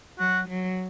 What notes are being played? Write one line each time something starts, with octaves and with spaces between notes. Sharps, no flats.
F#3 F#4
F#3